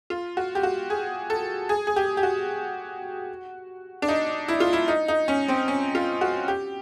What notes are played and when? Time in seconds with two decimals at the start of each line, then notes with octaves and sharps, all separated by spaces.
0.10 F4
0.37 F#4
0.55 G4
0.63 F#4
0.90 G#4
1.30 A4
1.69 G#4
1.87 G#4
1.96 G4
2.17 G4
2.23 F#4
4.02 D4
4.08 D#4
4.48 E4
4.60 F4
4.73 E4
4.88 D#4
5.08 D#4
5.28 C#4
5.48 C4
5.68 C#4
5.95 F4
6.21 F#4
6.48 G4